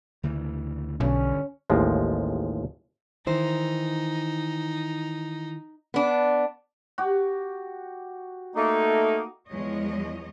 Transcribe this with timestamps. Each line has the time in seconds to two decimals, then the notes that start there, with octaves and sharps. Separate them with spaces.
0.23 D2 C#3 E3
1.00 B1 G2 D3 C#4
1.70 A1 D#2 F3 G#3
3.26 D#3 E3 D#4 C5
5.94 B3 D4
6.98 F#4 G4
8.55 A3 A#3 D#4
9.48 E2 F3 G#3 C#5 D#5